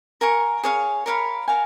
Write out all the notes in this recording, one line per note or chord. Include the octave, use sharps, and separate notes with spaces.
A#4 F5 G#5 C#6
G#4 C#5 F5
A#4 C#5 F5 B5
F#4 A#4 F5 G#5